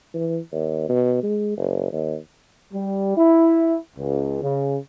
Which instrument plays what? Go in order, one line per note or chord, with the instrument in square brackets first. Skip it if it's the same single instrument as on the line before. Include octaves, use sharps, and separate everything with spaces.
[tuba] E3
D#2
B2
G#3
F#1
D#2
[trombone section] G3
E4
C#2
C#3